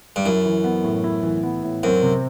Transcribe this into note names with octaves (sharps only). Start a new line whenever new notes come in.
G2
F#2 E4
E3
B3
A2
E4
E3
B3
A2
F#2 C4
C3